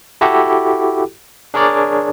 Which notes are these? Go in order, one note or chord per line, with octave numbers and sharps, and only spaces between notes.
E4 F#4 G4 A4
D4 G#4 A#4 C#5 D5